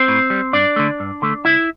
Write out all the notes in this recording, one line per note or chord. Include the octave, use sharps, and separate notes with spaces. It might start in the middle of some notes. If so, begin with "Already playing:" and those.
Already playing: C4 C5
A2
G3
G2 D4 D5
D3 A3
G2
D3 A3
C2 E4 E5